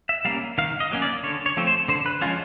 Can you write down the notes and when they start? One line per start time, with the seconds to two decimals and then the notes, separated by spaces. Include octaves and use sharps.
0.09 E5
0.25 G3 A#3 C#4 F5
0.58 D#3 F5
0.80 D#5
0.91 F#3 A#3 C#4
1.02 D5
1.23 D3 C#5
1.46 C#5
1.57 F3 A3 C4
1.67 C5
1.88 D3 C5
2.06 B4
2.21 F3 G#3 C#4 F4